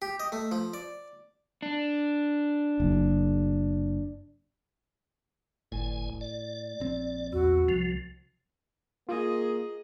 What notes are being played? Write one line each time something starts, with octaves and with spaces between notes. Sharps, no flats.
G4
D#5
A3
F3
D5
D4
F#1
G1 A2 G#5
D5
A#1 C4
E2 F#4
C2 F3
A#3 F4 G#4 D#5